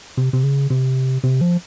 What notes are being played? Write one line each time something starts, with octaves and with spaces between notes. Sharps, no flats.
C3
C3
C#3
C3
C3
F3